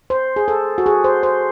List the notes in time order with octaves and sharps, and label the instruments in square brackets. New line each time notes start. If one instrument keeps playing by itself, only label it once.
[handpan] C5
G#4
A4
F#4
G#4
C5
C5